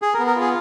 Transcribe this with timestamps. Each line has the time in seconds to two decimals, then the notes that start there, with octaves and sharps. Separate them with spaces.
0.02 G#4
0.14 A#4
0.19 B3
0.27 A#4
0.35 F4 G#4